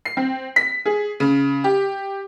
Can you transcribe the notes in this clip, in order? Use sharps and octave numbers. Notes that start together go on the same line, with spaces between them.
C7
C4
B6
G#4
C#3
G4